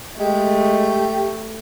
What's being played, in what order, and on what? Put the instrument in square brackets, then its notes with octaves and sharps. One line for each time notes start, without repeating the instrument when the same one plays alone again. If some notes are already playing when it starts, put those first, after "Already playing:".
[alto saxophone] G#3 [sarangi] A3 [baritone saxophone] G4